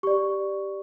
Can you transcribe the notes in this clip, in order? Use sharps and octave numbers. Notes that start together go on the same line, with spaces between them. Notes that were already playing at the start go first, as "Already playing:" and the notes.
G4 D5 C#6